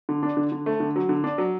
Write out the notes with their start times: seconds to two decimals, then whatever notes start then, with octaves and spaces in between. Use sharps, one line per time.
0.09 D3
0.23 D4
0.37 D3
0.52 D3
0.66 A3
0.80 D3
0.96 F#3
1.09 D3
1.24 D4
1.38 F#3